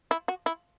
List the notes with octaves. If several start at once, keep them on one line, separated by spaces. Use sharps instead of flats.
E4
F#4
E4